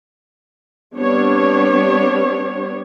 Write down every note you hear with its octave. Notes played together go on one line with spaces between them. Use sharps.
G3 B3 C4 D4 C#5